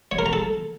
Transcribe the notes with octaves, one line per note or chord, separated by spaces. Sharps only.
C#5
A#4
A#5
A4